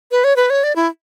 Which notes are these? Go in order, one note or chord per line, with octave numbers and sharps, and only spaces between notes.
B4
C#5
B4
C#5
D5
E4